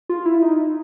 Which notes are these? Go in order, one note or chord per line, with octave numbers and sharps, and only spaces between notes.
F4
E4
D#4